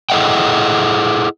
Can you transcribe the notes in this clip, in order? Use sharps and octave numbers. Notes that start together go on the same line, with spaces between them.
E4 G#4 A4 D#5 F#5 G5